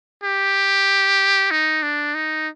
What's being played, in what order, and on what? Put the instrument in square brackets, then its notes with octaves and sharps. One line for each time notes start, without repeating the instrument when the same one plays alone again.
[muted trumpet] G4
D#4
D4
D#4